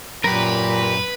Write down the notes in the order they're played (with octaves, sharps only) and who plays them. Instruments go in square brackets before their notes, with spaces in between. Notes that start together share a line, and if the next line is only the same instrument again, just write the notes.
[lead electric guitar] F#2 [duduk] A#2 [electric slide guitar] G4 A#4 [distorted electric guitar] B4